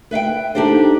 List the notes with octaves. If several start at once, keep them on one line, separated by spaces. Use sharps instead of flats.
B4 E5 F5 G5
D4 D#4 G4 A4 C5